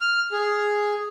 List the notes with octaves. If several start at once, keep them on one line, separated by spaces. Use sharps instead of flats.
F6
G#4